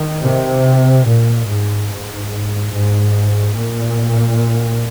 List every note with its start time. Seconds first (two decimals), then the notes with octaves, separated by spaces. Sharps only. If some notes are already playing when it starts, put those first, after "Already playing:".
Already playing: D#3
0.24 C3
1.07 A#2
1.49 G#2
1.91 G#2
2.74 G#2
3.56 A#2